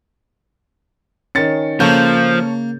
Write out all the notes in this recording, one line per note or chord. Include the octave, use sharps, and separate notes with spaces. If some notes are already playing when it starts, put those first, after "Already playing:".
D#3 C#4 A6 C#7
C#3 F3 A#3 A4 C#5 G6